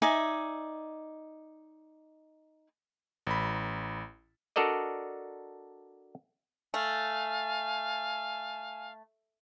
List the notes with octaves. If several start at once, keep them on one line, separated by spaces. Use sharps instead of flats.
D#4 D5 E5 G#5
A1 B5
D4 F#4 A4 A#4 D5 D#5
A3 F5 G#5